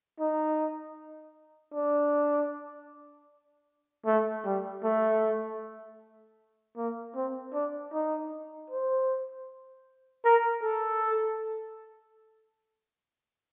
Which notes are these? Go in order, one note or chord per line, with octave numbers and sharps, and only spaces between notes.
D#4
D4
A3
G3
A3
A#3
C4
D4
D#4
C5
A#4
A4